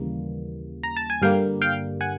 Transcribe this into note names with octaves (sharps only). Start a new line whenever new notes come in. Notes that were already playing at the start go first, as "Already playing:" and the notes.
Already playing: D#2 C#3 E3 G3 A#3
A#5
A5
G#5
G2 D3 G3 A#3 F5 G5
F5 G5
F#5 G#5